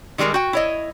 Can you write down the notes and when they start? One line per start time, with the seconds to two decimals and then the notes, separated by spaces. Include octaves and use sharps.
0.18 D#3 G3 G#3 D#4 A#4
0.34 F#4 G5
0.53 E4 C#5 D#5